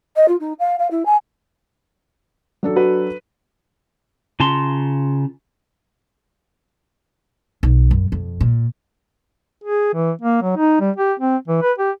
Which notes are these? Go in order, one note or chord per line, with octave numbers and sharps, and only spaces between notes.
D#5
F4
D#4
F5
F5
E4
G#5
F#3 D4 A4
F#4 B4
C#3 F4 A5 A#5 C6
B1
F#2
F2
A#2
G#4
E3
A#3
F#3
D#4
G3
G4
C4
E3
B4
G4